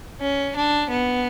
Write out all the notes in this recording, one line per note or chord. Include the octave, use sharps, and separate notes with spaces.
C#4
D4
B3